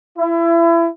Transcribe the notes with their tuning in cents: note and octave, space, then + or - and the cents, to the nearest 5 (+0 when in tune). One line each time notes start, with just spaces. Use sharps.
E4 +30